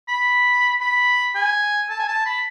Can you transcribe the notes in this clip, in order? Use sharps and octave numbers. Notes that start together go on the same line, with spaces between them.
B5
B5
G#5
A5
G#5
A5
B5